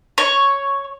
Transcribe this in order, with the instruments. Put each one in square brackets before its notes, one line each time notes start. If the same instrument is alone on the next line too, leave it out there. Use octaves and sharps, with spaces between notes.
[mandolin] C#5